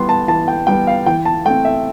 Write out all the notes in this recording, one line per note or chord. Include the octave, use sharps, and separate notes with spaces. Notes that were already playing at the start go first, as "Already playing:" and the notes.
Already playing: E3 G3 B3 C6
A5
E3 A5
G5
G3 B3 G5
F5
E3 G5
A5
A3 C4 G5
E5